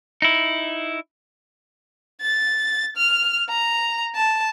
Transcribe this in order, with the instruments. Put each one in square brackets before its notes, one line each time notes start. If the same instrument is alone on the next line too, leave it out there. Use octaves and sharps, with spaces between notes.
[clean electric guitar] D#4 E4
[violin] A6
F6
A#5
A5